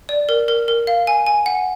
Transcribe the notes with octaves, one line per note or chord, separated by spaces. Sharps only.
D5
A#4
A#4
A#4
F5
G#5
G#5
F#5